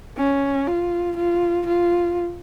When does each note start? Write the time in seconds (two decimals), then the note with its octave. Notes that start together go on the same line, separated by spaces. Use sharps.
0.17 C#4
0.67 F4
1.16 F4
1.66 F4